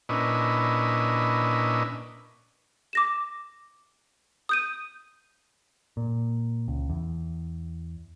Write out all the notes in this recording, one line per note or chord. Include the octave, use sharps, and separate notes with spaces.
A#2 C#4 D4 E4 B4 D#5
D6 A#6 E7
D#6 G6 D#7
A#2
C#2
E2